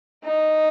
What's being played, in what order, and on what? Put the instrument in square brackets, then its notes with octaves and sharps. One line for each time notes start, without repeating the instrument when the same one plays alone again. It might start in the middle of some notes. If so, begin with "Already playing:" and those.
[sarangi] D#4